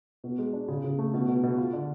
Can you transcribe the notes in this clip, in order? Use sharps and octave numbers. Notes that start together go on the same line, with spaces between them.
B2
G#3
D4
C#3
C#3
A3
B2
B2
B2
F4
D3